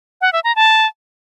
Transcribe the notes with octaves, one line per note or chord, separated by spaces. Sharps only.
F#5
E5
A#5
A5